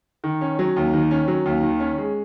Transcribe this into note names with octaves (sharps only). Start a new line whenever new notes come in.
D#3
C#4
F#3
D#2
D#3
C#4
F#3
D#2
D#3
C#4
G#3